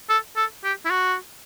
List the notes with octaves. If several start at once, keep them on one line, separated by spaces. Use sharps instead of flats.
A4
A4
G4
E4
F#4